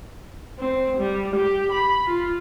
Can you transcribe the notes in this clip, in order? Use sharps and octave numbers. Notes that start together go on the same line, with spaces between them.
C4
G3
G4
B5
F4